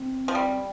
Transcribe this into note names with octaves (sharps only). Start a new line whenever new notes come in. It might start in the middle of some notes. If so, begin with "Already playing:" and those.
Already playing: C4
F3
G3